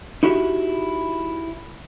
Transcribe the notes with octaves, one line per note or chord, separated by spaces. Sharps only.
D#4 E4 F#4 G4 E5